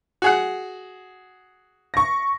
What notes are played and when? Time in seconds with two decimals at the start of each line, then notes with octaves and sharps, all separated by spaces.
0.22 F#4 G#4 F#5
1.94 C#6 A#6